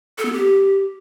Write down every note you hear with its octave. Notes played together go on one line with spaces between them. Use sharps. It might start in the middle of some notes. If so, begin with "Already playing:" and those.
A4
B3
G4